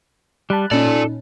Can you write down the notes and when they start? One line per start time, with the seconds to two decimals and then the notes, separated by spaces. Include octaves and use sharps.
0.50 G3 A5 B5 F#6
0.71 A#2 C#4 D#4 F4 A4 D5